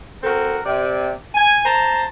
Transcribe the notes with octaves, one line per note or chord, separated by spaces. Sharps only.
C4 F#4 A4 A#4
C3 D5
G#5
C5 A5 A#5